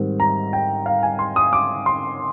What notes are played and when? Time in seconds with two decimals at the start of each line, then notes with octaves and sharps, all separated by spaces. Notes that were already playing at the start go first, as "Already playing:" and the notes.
Already playing: G#2 D#3 G3 C4
0.20 A#5
0.53 G5
0.86 F5
1.03 G#5
1.19 C6
1.36 D#6
1.53 D6
1.86 C6